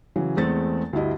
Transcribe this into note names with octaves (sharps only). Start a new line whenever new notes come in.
C#3 E3 F#3
E2 G#3 A3 C4 A4 A6
D2 G2 G3 E4 D#5